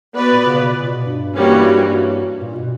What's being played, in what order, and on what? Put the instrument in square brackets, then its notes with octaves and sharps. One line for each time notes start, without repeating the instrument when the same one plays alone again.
[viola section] B3 F#4 B4 D5
[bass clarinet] A#2
C#3
B2
A#2
B2
G2
[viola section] E3 G3 A#3 C#4 F#4
[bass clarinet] G2
G2
A#2
B2